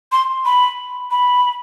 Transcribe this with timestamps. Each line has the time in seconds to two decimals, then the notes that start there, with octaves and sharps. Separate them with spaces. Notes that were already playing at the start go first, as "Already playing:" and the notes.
0.12 C6
0.45 B5
1.11 B5